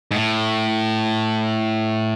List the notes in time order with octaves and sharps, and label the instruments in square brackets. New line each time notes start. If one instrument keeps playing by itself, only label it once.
[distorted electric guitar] G#2
A2